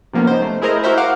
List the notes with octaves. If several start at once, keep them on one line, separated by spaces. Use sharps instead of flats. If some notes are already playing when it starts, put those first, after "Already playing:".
C3 F3 A#3 B3 C#4
D#4 C5
A3
E4 G#4 A#4 C5 D#5 A#5
E4 F#4 A#4 C5 E5
F5 F#5 D6